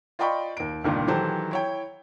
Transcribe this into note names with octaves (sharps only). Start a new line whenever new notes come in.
F4 D5 D#5 G5 B5 C#6
D#2 D7
C#2 G2 A#2 D#3
D#3 E3 F#3 G4 A4 C5
E4 C#5 G5